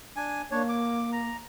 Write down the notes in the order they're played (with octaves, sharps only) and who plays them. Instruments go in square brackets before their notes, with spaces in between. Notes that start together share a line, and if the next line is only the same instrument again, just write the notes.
[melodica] D4 G#5
[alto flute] A#3 [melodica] D4 C#5
[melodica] D6
A#5